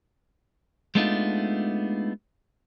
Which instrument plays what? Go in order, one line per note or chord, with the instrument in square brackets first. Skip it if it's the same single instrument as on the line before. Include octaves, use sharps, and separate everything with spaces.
[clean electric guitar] G#3 A3 B3 D4 D#4 F4